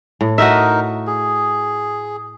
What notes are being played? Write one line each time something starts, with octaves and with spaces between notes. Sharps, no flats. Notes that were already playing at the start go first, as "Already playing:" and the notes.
A2
D#4 F#4 A#4 D#5 E5
G#4